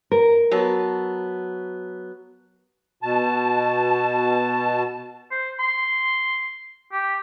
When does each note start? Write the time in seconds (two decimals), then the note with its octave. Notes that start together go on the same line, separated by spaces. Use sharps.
0.12 A#4
0.51 F#3 B3 A5
3.03 B2 A5
5.31 C5
5.59 C6
6.92 G4